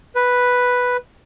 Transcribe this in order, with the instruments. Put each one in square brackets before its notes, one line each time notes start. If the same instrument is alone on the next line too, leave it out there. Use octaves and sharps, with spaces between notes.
[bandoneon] B4